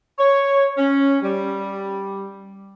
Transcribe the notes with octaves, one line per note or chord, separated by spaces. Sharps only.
C#5
C#4
G3